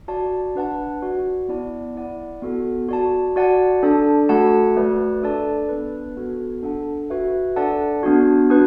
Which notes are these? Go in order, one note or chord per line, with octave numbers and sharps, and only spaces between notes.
F#4 D5 A5
D4 B4 F#5 A5
F#4 D5 F#5
B3 E4 D5 F#5 A5
E4 D5 F#5
B3 F#4 A4
F#4 D5 A5
F#4 D5 F#5 A5
D4 A4 D5 A5
A3 F#4 A4 F#5 A5
A3 F#4 B4 D5
D4 A4 D5 A5
B3 D4 B4
B3 F#4 A4
D4 A4 F#5 A5
F#4 B4 E5
D4 A4 D5 F#5 A5
B3 D4 F#4
D4 F#4 B4